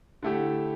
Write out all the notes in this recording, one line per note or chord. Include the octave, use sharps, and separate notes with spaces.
D3 A3 E4 G4